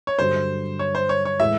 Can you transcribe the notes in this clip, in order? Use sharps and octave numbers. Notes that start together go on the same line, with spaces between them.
C#5
G2 D3 F#3 C5
C#5
C5
C#5
C#5
A2 E3 G#3 E5